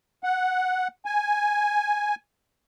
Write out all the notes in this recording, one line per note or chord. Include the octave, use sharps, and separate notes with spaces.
F#5
G#5